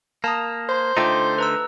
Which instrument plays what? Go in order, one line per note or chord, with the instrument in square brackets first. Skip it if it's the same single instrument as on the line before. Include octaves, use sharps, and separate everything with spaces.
[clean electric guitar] A#3 [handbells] A5 A#5 D#6
[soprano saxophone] C5
[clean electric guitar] D3 A3 D#4 [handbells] F4 G5 D6
[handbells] B4 A#5 E6